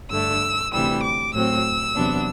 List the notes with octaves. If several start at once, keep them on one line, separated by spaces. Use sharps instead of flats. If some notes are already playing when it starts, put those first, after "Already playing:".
G2 D3 A3 E6
D2 C3 E3 G3 E6
D6
A2 F#3 C4 E6
E2 C3 F#3 B3 D4